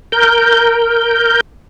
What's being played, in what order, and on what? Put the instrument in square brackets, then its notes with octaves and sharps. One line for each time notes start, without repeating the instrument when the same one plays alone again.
[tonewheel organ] A#4 G6